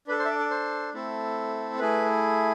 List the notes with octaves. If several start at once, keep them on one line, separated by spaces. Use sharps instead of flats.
D4 A4 B4
C5
E5
D5
D5
C5
A3 C4 E4 A4
A3 E4 G#4 B4